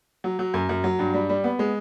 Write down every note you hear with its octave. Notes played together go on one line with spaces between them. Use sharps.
F#3
F#3
F#2
F#2
F#3
G2
G3
G3
B3
G#3